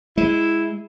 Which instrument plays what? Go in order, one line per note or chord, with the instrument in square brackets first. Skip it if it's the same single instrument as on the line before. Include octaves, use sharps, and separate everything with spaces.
[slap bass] G#3 [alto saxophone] E4